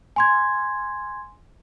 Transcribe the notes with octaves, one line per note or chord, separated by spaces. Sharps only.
G#5 C6 G#6